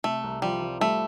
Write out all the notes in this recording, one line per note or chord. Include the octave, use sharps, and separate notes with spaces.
C3 A3
C2
F3 G3
F3
G3 A3